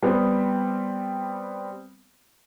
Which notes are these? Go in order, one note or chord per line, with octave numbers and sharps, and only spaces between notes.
G3 B3 C4